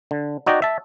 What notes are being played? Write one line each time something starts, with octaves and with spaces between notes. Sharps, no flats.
D3
D#4 F#4 D5 D#5 G5
E5 A5